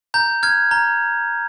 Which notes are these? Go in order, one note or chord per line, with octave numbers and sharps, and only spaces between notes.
A#5 G6
F6 G#6
A#5